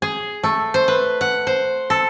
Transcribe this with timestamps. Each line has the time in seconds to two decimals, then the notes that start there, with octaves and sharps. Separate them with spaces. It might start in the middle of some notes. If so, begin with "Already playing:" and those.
0.02 G#4
0.43 A3
0.74 C5
0.88 B4
1.21 F#5
1.47 C5
1.90 A4